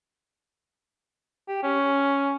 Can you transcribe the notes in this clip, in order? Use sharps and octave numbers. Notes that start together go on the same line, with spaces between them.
G4
C#4